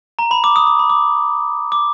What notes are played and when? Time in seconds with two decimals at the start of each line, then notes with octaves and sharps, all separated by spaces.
0.19 A#5
0.31 B5
0.44 D6
0.56 D#6
0.67 D6
0.79 B5
0.90 D6
1.72 D6